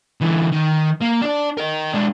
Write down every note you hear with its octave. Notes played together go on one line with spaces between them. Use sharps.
D3 E3
D#3
A#3
D4 D5
A#4 D#5
G#3 D4